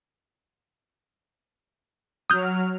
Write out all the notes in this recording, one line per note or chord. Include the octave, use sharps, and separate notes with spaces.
F#3 D#6 F6 G6